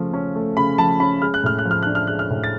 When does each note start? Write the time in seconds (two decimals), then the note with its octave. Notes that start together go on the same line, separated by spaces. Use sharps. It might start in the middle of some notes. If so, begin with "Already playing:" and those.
Already playing: C#3 F3 A3 C#4
0.13 C#4
0.35 A3
0.57 C#3 B5
0.78 F3 A5
1.00 C#4 B5
1.22 G#3 F6
1.34 F#6
1.44 A2 F6
1.59 F#6
1.65 F3
1.71 F6
1.83 D4 F#6
1.95 F6
2.07 G#3 F#6
2.19 F6
2.30 A2
2.44 A6